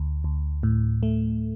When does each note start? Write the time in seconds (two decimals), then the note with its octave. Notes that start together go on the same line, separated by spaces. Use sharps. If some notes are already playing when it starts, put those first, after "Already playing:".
Already playing: D2
0.24 D2
0.63 A2
1.03 A3